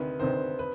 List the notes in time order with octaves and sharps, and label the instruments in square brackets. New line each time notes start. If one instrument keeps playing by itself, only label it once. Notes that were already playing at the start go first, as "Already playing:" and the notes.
Already playing: [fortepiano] D2 C3 D#3 [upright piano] B4
[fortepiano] D2 C3 D#3 [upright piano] C5
[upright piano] B4